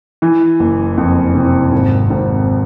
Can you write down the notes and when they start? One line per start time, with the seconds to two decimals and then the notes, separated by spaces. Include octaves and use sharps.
0.22 E3
0.60 F#1
0.98 F2
1.35 C3
1.72 G#1
2.10 G#1